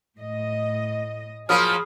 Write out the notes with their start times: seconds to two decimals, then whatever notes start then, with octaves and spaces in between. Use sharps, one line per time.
0.19 A2 D#5
1.49 F3 F#3 A#3 G#4 B5 D#6 F6